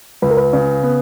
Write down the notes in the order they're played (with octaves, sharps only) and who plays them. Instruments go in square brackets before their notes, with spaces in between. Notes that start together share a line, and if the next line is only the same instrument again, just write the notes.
[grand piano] C#2 [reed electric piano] B4
[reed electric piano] A#4
B4
[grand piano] C#3
B3